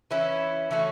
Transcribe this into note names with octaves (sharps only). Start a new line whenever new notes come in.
E3 C#4 E4
E3 A3 C#4 F#4